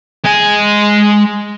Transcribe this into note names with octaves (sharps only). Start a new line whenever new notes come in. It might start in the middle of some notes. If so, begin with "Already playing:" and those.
G#3 G#5